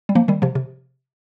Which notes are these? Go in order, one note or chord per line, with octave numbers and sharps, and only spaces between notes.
G3
F3 A#3
D#3 G3
C3 F3
C3